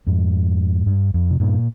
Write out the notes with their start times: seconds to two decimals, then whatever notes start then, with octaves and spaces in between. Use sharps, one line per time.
0.07 F2 G#2
0.86 G2
1.14 F2
1.31 C3
1.40 G2 A#2